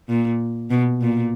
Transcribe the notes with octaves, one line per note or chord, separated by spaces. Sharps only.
A#2
B2
A#2